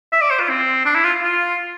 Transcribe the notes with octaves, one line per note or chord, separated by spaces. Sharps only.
E5
D5
C5
F4
C4
D4
E4
F4
F4